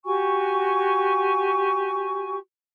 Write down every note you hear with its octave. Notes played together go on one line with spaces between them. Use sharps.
F#4 G4 G#5 C#6